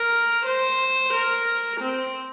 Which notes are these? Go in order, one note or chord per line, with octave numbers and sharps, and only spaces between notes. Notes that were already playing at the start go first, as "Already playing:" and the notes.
Already playing: A#4
C5
A#4
C4